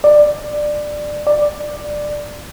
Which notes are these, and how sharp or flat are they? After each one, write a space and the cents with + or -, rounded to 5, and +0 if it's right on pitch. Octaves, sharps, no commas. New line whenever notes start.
D5 +15
D5 +10